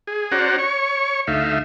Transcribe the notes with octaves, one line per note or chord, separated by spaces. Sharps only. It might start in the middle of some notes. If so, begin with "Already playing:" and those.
G#4
C#4 F#4 C5 D5 F#5 A#5
C#5 C#6
D2 A3 D#4 E5 F5